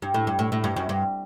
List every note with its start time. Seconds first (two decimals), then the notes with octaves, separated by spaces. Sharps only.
0.02 G2
0.14 A2
0.27 G2
0.39 A2
0.52 A2
0.64 G2
0.76 F#2
0.89 G2